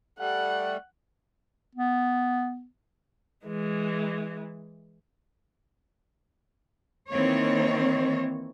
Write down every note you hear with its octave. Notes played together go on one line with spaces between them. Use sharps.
G3 A3 F#5
B3
E3 G#3
D#3 E3 A#3 C4 C#5